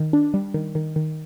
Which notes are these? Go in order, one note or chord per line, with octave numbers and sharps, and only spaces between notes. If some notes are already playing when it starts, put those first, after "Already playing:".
Already playing: D#3
D4
G3
D#3
D#3
D#3